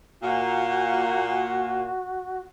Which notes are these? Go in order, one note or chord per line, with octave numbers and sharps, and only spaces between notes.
A#2 F#4